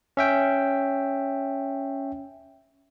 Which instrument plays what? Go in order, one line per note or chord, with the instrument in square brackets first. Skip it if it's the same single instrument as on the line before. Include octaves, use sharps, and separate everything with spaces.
[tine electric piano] C#4 E5 G5